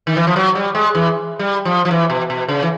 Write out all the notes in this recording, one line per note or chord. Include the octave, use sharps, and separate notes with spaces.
D#3
E3
F3
F#3
G3
G#3
E3
G3
F3
F3
E3
B2
B2
C#3
E3